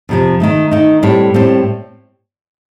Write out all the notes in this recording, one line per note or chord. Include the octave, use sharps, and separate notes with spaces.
F2 C3 F3
D#3 A3 D#4
D#3 A3 D#4
A2 G3 C4
A2 G3 C4